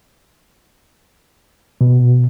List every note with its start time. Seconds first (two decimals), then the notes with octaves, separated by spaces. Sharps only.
1.81 B2